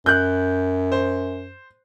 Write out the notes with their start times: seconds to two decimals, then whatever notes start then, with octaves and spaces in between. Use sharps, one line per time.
0.06 F#2 F#6 G6
0.92 C5